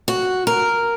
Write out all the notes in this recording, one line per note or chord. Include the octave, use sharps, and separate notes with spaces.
F#4
A#4